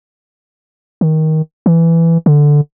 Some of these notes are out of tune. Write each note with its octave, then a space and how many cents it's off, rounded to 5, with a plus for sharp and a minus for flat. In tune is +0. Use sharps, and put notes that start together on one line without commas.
D#3 +15
E3 +10
D3 +0